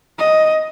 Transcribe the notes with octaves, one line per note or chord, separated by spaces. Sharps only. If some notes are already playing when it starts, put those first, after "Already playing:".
D#5